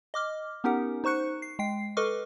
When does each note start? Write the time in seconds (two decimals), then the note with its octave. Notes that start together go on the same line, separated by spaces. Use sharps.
0.14 D#5 D6 F6
0.64 B3 C#4 D#4 G4 A#4 F#5
1.04 D#4 C5 C#6 F#6 C#7
1.42 C7
1.59 G#3 G5 C7
1.97 A4 B4 D#5 C#6 D6 F6